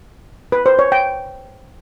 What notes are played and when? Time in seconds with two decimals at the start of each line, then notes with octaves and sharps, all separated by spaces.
0.52 B4
0.66 C5
0.79 C#5
0.92 G5